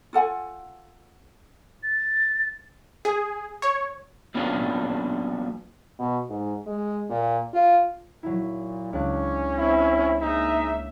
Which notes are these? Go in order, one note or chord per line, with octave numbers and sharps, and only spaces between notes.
F4 A4 F#5 G#5
A6
G#4
C#5
F#3 A#3 B3 C#4 D4 F4
B2
G#2
G#3
A#2
F4
A#2 F#3 E4
C#2 C#4 D4 F#6
C4 E4
A#3 D#4 G#4 E5